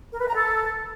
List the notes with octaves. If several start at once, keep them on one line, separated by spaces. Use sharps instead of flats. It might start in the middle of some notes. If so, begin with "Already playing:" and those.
A#4
B4
A#5
A4